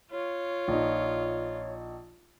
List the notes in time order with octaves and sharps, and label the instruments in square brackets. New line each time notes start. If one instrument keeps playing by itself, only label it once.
[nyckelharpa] F4 [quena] C#5
[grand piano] A#1 D#4